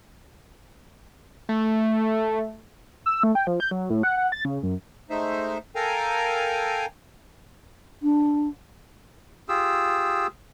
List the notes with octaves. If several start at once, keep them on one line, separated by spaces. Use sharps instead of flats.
A3
E6
A3
G5
F3
G6
F#3
A2
F#5
F#5
A6
C#3
F#2
G#3 A3 D#4 C5 E5
A4 A#4 F5 G5 G#5 A#5
D4
F4 G4 G#4 E6